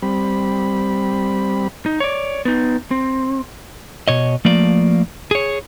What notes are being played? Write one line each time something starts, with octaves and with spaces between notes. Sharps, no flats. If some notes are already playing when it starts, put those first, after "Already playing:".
G3 C4 B5
D#4
C#5 D5
B3 D#4
C4
B2 C#5 D#5
F3 A3 A#3 D5
G#4 C#5